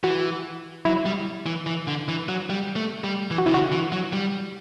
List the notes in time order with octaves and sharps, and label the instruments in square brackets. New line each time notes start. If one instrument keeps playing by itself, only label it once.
[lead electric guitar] E3 [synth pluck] F#4
[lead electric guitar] F#3 [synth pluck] E4
[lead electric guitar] G3
E3
E3
D3
E3
F#3
G3
A3
G3
E3
[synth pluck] F#4
[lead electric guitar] C3 [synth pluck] E4
[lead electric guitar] D3 [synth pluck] F#4
[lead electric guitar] E3
F#3
G3